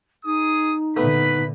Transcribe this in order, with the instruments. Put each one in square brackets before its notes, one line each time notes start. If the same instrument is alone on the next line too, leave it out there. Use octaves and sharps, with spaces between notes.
[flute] D#4 [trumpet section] G#4 D#6
[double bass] A#2 D3 [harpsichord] A3 B3 [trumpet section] B4 B5